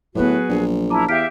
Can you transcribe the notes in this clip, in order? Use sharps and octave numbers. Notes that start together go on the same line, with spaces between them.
A2 F#3 B3 F#4 G#4 B4
A#1
E4 A#4 A5 A#5 D6
E2 G4 E5 F5 F6 B6 D7